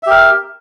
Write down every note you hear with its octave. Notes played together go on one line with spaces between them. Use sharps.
G4 A#4 E5